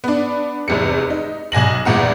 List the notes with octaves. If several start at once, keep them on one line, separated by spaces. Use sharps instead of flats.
B3 D4
F1 E2 C3 C#7
D#4
B1 G#5 A#6 F#7
G1 E2 A#2 F#5 A#5